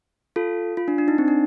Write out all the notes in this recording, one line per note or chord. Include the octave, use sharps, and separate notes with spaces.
F4 A4
F4
D4
D4
D#4
C4
D4